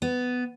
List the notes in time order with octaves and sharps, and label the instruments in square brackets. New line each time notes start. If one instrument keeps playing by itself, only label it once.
[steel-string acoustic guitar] B3